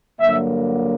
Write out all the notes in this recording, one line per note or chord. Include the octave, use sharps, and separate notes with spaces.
G2 D3 F#3 A#3 E5